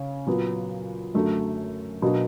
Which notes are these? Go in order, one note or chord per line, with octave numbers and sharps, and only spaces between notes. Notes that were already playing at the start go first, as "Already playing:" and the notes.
Already playing: C#3 C#4
A#2 F#3 B3
F#2 D3 F#3 A3
B2 F#3 A#3 D4